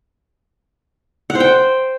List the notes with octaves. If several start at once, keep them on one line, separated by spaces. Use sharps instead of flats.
F#5
C5
G5